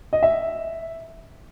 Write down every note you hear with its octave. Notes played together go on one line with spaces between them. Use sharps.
D#5
E5